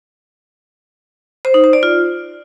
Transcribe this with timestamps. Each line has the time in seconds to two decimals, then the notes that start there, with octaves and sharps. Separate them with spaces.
1.45 C5
1.54 D#4
1.64 C5
1.73 D5
1.83 F4